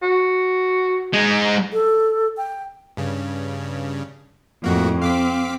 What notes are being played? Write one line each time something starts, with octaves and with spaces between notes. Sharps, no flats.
F#4
G#3 D#4
A4
G5
G2 C#3
F2 A2 A#3 F#4
C4 F5 D6 B6